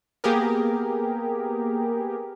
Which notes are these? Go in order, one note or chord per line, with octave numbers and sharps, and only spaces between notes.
A#3 B3 G4 G#4 A#4